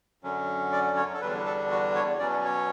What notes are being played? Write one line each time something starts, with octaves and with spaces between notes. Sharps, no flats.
F#2 D3 F#3 C#4
D5
C#5
A4
E2 D3 G3 D4 B4
A4
F#4
C#5
B2 F#3 C#4 D5
C#5